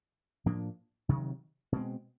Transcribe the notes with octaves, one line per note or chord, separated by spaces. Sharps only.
A2 F3 A#3 D4
C3 D#3 F#3
B2 G#3 C4